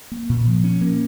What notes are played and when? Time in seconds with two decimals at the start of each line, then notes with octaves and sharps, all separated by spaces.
0.12 A#3
0.29 A#2
0.47 F3
0.64 C#4
0.81 A#3